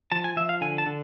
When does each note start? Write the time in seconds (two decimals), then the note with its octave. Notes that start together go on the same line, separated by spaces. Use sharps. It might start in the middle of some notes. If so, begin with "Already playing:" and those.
0.12 F3 A5
0.24 G#5
0.36 F3 E5
0.49 F5
0.61 D3 G#5
0.78 A5
0.86 D3